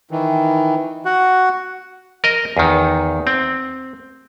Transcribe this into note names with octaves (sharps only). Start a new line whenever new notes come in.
D#3 E3
F#4 F#5
A#4 D#5
E2 D#3
C4